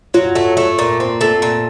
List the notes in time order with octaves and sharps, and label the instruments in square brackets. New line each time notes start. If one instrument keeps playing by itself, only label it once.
[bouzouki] F#3 [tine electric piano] F4
[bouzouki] A3
A3
A#2
C4
A3
A#2